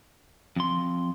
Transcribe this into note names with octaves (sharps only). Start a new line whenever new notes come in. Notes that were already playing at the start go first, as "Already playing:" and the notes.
F2 C6